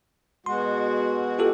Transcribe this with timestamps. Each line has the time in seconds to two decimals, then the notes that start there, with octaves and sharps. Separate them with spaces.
0.46 B2 G#3 F#4 C6
1.39 F4 G4 A4